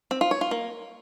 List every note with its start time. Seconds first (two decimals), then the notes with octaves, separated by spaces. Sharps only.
0.11 C4
0.21 F4
0.31 C#5
0.41 F4
0.51 A#3